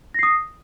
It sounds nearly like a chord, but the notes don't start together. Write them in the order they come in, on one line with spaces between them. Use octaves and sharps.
A#6 C7 D#6